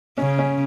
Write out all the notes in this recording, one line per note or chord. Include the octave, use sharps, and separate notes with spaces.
C#3 C#4
C#4